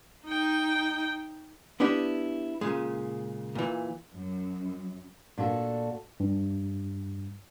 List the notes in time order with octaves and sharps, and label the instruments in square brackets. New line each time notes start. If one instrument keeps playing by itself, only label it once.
[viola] D#4 G5
[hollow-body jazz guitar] B3 D4 E4 G4 E5
A#2 C#3 G#3
A#2 E3
[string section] F#2
[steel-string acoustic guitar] A#2 D4 F#4 A4
[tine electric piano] G2